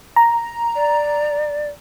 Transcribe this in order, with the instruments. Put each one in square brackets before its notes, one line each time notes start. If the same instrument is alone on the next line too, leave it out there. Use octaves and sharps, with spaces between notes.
[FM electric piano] A#5
[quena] D5